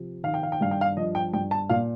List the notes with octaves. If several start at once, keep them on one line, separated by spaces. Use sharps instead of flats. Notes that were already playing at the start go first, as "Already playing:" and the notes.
Already playing: C3 F3
D#3 F5
G5
F5
G5
G2 F5
G5
F5
F3 D#5
G5
G2 G5
A5
A#2 F5